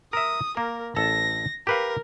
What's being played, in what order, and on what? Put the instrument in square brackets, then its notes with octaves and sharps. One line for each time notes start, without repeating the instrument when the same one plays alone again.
[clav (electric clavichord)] A#4 E5 [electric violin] D#6
[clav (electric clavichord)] A#3 [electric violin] A#4
[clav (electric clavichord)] A1 A4 A5 [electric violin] A#6
[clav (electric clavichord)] G4 B4 F5 [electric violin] A#4